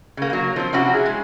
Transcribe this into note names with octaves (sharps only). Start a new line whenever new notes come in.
C#3 A#3
F#3 A#3
F3 C4
C3 C#4 E4 F#4 G4
G#4
G#3